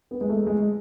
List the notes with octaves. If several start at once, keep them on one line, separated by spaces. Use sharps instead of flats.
B3
G#3
A3
G#3